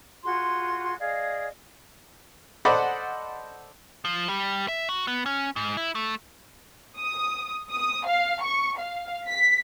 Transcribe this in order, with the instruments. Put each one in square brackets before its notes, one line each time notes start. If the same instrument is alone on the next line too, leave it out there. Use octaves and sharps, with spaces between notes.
[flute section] F4 F#4 G#4 C6
G#4 D5 D#5 F5
[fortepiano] A4 C5 D5 D#5 F#5 B5
[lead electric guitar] F3
G3
E5
F#4
B3
C#4
G#2
E4
A3
[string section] D#6
D#6
F5
C#6
F5
B6